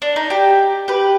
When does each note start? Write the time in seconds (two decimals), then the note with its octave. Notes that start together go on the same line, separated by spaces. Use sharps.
0.02 D4
0.16 D#4
0.30 G4
0.88 G4 B4